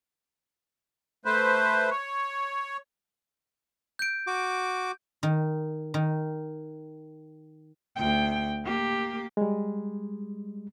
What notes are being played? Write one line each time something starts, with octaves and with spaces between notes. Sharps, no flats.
A3 B4 C5
C#5
G6 D7
F#4 D6
D#3
D#3
D2 G5
A#3 G4
G3 G#3